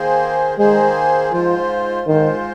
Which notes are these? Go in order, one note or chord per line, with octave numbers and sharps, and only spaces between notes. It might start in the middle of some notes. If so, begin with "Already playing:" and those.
Already playing: D#3 A#3 G#4 C5
D#3 G#3 A#3 G#4 C5
G#2 F3 G#3 F4 C5
G#2 D#3 G#3 F4 C5